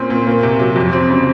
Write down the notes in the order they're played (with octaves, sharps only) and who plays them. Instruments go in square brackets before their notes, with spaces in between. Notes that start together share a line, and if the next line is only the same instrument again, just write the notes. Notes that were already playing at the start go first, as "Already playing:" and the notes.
Already playing: [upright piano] A#2 C4 C#4
A#2
A#3
C3
F#3
F2
C4
C#3